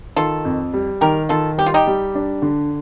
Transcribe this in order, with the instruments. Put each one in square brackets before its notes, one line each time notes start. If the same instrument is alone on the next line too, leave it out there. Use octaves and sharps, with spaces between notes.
[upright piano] D#3 [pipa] F4 A4
[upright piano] F2
G3
[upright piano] D#3 [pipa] G4 A#4
[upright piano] D#3 [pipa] F4 A4
[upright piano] G3 [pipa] G4
[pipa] F4
D#4 G4
[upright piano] G3
D4
D3